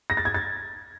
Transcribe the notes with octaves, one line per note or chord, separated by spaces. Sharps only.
A#6
A6
G#6
A6